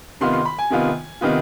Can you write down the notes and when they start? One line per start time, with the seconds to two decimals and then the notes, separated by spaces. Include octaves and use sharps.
0.21 C3 D#3 B3 F4 C6
0.33 C6
0.45 B5
0.59 G#5
0.70 C3 D#3 B3 F4
1.21 C3 D#3 B3 F4